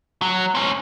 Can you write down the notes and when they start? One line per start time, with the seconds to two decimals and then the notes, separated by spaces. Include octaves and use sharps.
0.22 F#3
0.55 C4 C#4